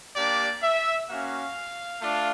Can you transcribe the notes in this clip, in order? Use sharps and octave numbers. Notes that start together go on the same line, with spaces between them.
A#3 D4 G4 D5
E5
A#3 C#4 F#4 F5
A3 D4 F4